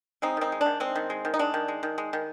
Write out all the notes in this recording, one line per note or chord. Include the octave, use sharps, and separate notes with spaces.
G#3 C4 D#4
D#3 C4 D#4
G#3
D4
D#3
G#3 C4
D#3
G#3
D#3
D#4
G#3 D4
D#3
G#3
D#3
G#3
D#3